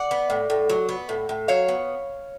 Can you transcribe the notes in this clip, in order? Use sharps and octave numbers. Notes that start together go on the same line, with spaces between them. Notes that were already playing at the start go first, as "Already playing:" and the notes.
Already playing: D5 F#5
B3
A2
A2
F#3
B3
A2
A2
F#3 C#5 F5
B3